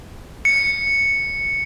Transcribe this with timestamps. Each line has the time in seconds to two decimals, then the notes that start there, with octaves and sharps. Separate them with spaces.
0.45 C#7